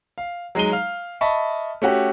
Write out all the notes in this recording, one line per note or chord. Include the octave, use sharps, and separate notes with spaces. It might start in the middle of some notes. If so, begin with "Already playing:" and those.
F5
F#3 G#3 D#4 D#7 G7
F5 F6
D#5 E5 A5 B5 C#6
A3 C#4 F#4 G4